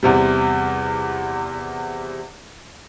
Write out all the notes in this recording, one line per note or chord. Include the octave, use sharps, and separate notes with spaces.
E2 C3 G3